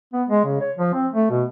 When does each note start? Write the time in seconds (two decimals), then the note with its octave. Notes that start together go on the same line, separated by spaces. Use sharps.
0.13 B3
0.29 G#3
0.45 C#3
0.61 C#5
0.78 F3
0.94 C4
1.12 A3
1.30 B2